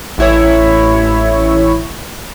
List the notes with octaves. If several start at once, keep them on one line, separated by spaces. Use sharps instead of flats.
A1 E4 C#5